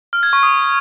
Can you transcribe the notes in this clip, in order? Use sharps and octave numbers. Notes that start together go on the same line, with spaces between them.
F6
G#6
C#6
D#6